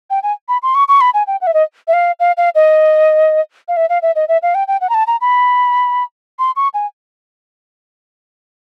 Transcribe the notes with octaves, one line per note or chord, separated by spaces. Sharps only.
G5
G#5
B5
C6
C#6
C#6
B5
G#5
G5
F#5
E5
D#5
E5
F5
F5
F5
D#5
F5
E5
F5
E5
D#5
E5
F5
G5
G5
F#5
A#5
A5
A#5
B5
C6
C#6
G#5